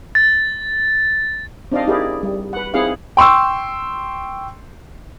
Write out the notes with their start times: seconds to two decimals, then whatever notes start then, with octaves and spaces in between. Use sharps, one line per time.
0.15 A6
1.72 C4 D4 D#4 D5 D#5 F5
1.87 D#4 E4 G4 G#4 A#4 D5
2.23 G3
2.53 B4 F#5
2.74 C4 D#4 E4 G#4 F5 F#5
3.17 G5 C6 C#6 E6